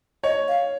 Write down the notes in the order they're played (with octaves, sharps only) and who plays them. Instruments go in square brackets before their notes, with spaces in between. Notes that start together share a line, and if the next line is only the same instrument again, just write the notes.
[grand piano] C#5 [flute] D#5
[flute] F5